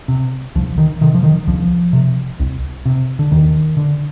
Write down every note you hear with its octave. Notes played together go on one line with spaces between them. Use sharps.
C3
C2 F3
D#3
C3 D#3
F3
D#3
C2 F3
C3
C2
C3
D3
D#2 D#3
D3